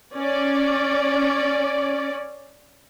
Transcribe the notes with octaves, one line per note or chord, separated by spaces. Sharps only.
C#4 D5